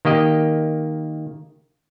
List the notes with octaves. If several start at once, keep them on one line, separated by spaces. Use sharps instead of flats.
D#3 A#3 G4 D#5